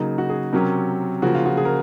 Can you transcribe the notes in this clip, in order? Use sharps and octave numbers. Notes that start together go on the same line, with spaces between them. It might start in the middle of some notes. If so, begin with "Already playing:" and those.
Already playing: C#3 F#3 A#3 D#4
F#4
G#4
C3 F#3 C#4 A#4
C#3 F3 A#3 F#4
F4
F#4
G#4
A#4